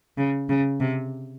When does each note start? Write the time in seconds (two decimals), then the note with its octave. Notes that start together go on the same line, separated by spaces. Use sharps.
0.17 C#3
0.49 C#3
0.80 C3